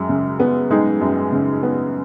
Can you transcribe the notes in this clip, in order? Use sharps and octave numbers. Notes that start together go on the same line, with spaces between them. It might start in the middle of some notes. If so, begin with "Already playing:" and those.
Already playing: F#2 G#3
C#3
B3
G#3 D#4 G#4
F#2
C#3
B3